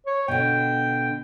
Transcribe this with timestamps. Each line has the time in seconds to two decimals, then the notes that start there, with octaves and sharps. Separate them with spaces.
0.07 C#5
0.28 B2 D3 G5